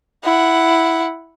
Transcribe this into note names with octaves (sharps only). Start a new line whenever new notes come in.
E4 F#5